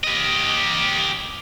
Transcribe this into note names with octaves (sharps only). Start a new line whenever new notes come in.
G4 D#5